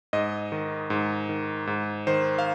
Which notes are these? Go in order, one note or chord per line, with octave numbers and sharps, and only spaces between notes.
G#2 D#5
D#3
G#2
D#3
G#2
D#3 C5
F5